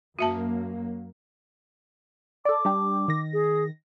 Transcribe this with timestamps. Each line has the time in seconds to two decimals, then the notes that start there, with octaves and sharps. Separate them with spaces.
0.19 F#2 F#3 A#3 F#4 E5 A5
2.45 A4 D5 D6
2.65 G3 D4 G4
3.08 D#3 A#6
3.33 G#4